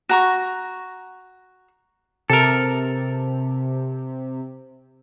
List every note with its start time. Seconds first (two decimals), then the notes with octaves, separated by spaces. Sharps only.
0.09 F#4 A#5 C#6
2.30 C3 A4 A#4